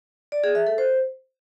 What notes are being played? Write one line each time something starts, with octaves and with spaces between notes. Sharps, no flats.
D5
G#4
E5
A4
C5